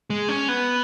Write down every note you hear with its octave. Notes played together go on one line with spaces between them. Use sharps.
G#3
C#4
B3